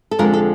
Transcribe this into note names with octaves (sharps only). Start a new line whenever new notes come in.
A4
F2 D3 F3 G#3 A#4
A4